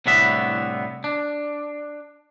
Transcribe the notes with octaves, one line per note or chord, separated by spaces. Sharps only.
C2 A2 D3 B3 F#4 E5
D4